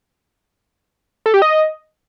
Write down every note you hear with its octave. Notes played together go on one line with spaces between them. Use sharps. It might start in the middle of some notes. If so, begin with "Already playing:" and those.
A4
G4
D#5